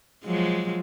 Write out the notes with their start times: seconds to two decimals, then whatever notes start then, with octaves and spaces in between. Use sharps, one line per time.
0.25 F3 F#3 G#3